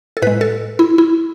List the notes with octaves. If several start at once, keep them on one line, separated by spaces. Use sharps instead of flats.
A4
A2 G#3 B4
A4
E4
E4